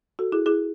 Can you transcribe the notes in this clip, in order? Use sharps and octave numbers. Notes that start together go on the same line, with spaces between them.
F#4 A4
E4 G#4
E4 G#4